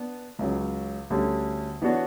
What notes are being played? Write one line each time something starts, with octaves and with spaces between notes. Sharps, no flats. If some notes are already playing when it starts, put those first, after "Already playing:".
Already playing: B3 D4
C#2 C#3 F#3
D2 D3 G3 C#4
E3 B3 D4 F#4 C#5